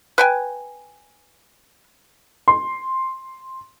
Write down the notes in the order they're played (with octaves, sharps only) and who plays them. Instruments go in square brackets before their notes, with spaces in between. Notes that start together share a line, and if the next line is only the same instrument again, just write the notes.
[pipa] B4 G5 G#5
[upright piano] C6